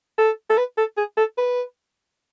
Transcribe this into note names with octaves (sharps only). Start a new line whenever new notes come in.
A4
A4
B4
A4
G#4
A4
B4